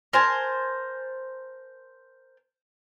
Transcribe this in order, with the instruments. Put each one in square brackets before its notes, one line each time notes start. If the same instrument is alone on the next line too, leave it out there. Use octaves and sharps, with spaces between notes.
[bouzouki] A#4 C5 G#5 A5